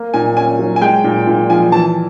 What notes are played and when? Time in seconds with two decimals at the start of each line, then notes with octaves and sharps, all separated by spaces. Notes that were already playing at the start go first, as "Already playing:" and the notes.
Already playing: A#3
0.14 A#2 G#5
0.37 C#4 G#5
0.59 F#3
0.76 G#5
0.81 G#3 G5
1.04 A#2
1.27 A#2
1.50 F3 G#5
1.72 E3 A5